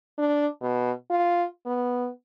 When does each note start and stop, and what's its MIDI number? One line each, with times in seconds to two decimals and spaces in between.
0.18 0.47 62
0.62 0.91 47
1.10 1.45 65
1.66 2.09 59